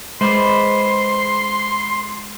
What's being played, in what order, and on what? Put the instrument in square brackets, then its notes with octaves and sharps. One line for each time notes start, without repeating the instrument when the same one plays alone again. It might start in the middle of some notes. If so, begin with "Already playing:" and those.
[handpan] G#3 [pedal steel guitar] B4 C5 D5 [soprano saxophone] C6